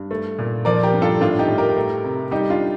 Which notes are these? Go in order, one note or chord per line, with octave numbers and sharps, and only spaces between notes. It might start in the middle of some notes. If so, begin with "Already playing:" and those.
Already playing: G2
A3
A#2
F3 A#4 D5
G4 A#4
G2
F4 A4
A2 D4 F4
D#4 G4
A2
G4 A#4
A3
C3
G3 D#4 G4
D4 F4